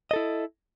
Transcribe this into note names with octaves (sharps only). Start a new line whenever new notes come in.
E4 A4 D#5